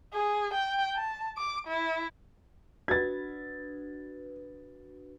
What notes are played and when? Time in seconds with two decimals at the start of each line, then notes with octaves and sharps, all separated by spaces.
0.13 G#4
0.53 G5
0.96 A5
1.37 D6
1.67 E4
2.88 D4 F#4 B4 G#6 A6